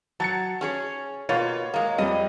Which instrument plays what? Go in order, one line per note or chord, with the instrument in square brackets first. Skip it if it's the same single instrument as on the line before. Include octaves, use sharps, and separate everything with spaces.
[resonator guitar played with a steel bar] F#3 [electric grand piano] A5 A6 C#7
[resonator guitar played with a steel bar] C#4 G#4 C#5
[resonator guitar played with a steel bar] B2 A#3 F4 [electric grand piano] C#5
[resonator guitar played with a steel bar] G#3 A#3
[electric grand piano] F2 G3 [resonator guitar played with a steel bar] D#5